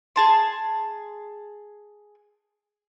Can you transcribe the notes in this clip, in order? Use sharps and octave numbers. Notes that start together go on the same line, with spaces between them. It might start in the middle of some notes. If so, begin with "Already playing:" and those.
G#4 A5 C6